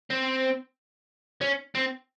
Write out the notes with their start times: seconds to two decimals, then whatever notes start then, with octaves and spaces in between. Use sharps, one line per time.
0.11 C4
1.41 C#4
1.75 C4